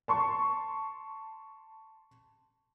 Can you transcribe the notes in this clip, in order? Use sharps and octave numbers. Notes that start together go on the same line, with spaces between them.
A5 C6 C#6